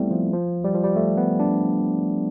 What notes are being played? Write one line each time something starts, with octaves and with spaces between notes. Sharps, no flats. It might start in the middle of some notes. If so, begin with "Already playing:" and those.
Already playing: G3 A3 B3 C4 E4
F3
F3
G3
F3
G3
A3
B3
D4